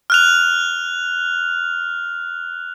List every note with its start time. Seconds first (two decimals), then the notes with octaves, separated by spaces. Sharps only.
0.10 F6 F#6 F7